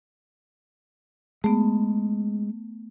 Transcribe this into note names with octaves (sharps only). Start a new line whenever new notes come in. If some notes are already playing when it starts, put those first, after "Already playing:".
G#3 A3 B3